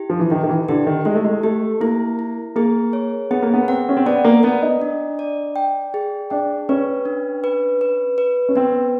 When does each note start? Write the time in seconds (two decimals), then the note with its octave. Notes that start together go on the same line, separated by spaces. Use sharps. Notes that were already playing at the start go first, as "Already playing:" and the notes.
Already playing: E4 G4
0.10 F3
0.20 E3
0.30 D#3 E4
0.43 D#3
0.49 E3
0.69 D3 G4
0.86 D#3
1.05 G#3 E4
1.15 A3
1.24 G#3
1.43 A3 G4
1.81 A#3 E4
2.19 E4
2.56 A#3 G#4
2.93 C#5
3.31 B3 G#4
3.42 A#3
3.54 B3
3.68 C4 F#5
3.89 C#4
3.97 C4
4.06 B3 D5
4.25 A#3
4.43 B3 D5
4.62 D#4
4.81 D4
5.19 D5
5.56 G5
5.94 G#4
6.30 D4 G5
6.69 C#4 B4
7.05 D4
7.44 B4
7.81 B4
8.18 B4
8.49 C#4
8.55 B3 C4